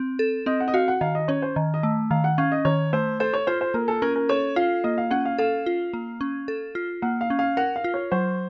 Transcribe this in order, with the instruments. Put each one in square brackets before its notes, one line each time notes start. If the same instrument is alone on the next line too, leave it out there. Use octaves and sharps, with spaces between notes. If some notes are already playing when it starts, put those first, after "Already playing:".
Already playing: [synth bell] C4
A4
[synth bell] C4 [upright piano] D#5
[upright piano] F#5
D#5
[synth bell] F#4 [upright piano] F5
[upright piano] F#5
[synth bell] D#3 [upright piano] F5
[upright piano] D#5
[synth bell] C#4 [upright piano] C#5
[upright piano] C5
[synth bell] D#3
[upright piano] D#5
[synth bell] A3
[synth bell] D#3 [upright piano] F5
[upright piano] F#5
[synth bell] C#4 [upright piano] F5
[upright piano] D#5
[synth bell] D#3 [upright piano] C#5
[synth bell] A3 [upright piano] C5
[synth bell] A4 [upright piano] C5
[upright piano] C#5
[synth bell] F4 [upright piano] C5
[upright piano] C5
[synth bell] A#3 [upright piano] A#4
[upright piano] A4
[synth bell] C#4 [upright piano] A#4
[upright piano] A#4
[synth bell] A4 [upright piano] C#5
[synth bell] F4 [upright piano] F5
[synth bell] A#3 [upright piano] D#5
[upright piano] F5
[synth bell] C#4 [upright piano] F#5
[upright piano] F5
[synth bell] A4 [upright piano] F5
[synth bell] F4
A#3
C#4
A4
F4
[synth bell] A#3 [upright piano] F#5
[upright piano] F5
[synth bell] C#4
[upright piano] F5
[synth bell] A#4 [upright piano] F#5
[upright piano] F5
[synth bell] F4
[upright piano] C#5
[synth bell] F#3 [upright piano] C5